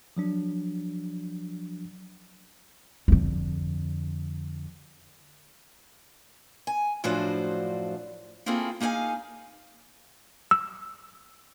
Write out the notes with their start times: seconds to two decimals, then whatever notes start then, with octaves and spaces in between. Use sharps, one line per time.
0.17 F3 F#3 D4
3.08 F2 D3
6.67 G#5
7.04 F#2 A2 F3 D4 F#4 C5
8.46 A#3 C4 E4 F4 G#4 A4
8.80 A#3 D#4 G#4 F5 G#5
10.51 E6